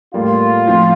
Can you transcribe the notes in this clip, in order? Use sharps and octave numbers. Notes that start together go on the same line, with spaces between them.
A2 G3 A#3 F4
A2 F3 C4